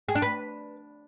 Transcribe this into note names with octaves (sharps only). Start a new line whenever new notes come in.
G#4
D4
B4